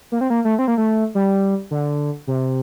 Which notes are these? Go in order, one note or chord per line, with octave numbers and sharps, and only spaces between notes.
A#3
C4
A#3
A3
C4
A#3
A3
G3
D3
C3